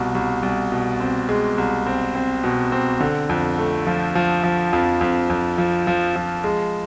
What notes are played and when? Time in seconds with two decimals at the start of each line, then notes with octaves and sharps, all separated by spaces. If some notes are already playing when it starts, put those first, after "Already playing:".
Already playing: C2 B2
0.15 C2
0.43 C2
0.72 B2
1.00 C4
1.29 G#3
1.58 C2
1.87 C4
2.15 C4
2.44 B2
2.72 C4
3.00 D3
3.29 F2
3.58 A3
3.87 F3
4.15 F3
4.43 F3
4.73 F2
5.01 F2
5.30 F2
5.58 F3
5.87 F3
6.16 F3
6.44 G#3